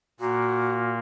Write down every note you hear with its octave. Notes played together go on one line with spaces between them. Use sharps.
A#2 A#3 F#4